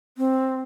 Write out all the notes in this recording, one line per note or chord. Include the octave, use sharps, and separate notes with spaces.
C4